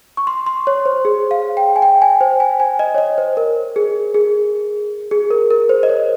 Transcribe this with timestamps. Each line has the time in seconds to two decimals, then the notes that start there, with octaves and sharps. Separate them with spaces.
0.17 C#6
0.27 C6
0.46 C6
0.67 C#5
0.86 C5
1.05 G#4
1.31 F5
1.57 G5
1.76 G#5
1.82 G5
2.02 G#5
2.21 C5
2.40 G#5
2.60 G#5
2.79 D#5
2.95 C#5
2.98 D#5
3.18 C5
3.37 A#4
3.76 G#4
4.14 G#4
5.11 G#4
5.30 A#4
5.51 A#4
5.69 C5
5.83 D#5
5.89 C#5